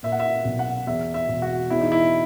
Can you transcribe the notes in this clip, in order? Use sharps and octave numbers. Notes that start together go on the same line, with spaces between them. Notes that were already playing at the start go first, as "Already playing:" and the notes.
A#2 E5
F#5
E5
B1
F#5
E2 E5
E5
E1
F#4
E2 E4
D#4
E4